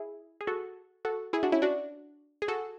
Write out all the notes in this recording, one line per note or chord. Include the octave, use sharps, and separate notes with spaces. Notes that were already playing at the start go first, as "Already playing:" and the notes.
Already playing: E4 G#4
G#4
F#4 A4
F#4 A4
E4 G#4
D4 F#4
C#4 E4
D4 F#4
G#4
F#4 A4